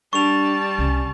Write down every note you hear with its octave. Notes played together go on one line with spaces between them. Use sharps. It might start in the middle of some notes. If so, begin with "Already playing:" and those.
G3 D4 A5 C#6 F7
C2 C#4